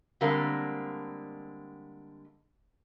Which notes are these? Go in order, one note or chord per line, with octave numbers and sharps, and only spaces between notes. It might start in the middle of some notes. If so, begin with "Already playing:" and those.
D3 G3 G#3 A#3 C4